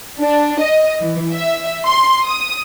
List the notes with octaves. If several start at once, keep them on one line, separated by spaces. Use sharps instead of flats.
D4
D#5
E3
E5
C6
D#6